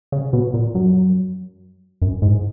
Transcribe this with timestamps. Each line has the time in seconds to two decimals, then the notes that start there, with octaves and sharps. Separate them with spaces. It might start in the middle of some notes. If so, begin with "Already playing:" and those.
0.12 C#3
0.33 B2
0.54 A#2
0.75 F#2
2.02 F#2
2.22 G#2